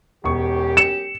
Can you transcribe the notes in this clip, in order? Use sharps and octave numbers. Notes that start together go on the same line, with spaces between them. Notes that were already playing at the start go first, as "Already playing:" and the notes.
E1 F#2 C#4 G4 C#6
C#7 E7